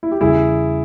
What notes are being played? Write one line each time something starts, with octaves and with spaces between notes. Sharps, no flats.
E4
G4
E2 C#3 G3 E4 G#4